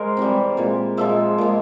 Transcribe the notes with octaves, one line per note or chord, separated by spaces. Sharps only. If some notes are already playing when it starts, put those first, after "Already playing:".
Already playing: G#3 A#4 C5
C3 E3 G3
A#2 G#3
A#2 F3 G#3 E5
A#2 G#3